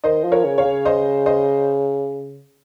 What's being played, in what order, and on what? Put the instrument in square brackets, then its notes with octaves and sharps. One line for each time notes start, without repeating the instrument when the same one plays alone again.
[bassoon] D#3 [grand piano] C5 D#5
[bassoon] F3
[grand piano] A#4 C#5
[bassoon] C#3
[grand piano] C#5 F5
[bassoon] C#3
[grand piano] C5 D#5
C5 D#5